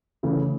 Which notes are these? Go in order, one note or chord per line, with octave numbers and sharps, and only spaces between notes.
C#3 E3 A3 E4